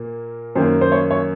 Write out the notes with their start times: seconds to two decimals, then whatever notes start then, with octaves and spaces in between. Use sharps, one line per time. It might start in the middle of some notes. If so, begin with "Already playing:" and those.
Already playing: A#2 A#3
0.55 F#2 D#3 A#3 C5
0.81 C5
0.92 C#5
1.11 C#5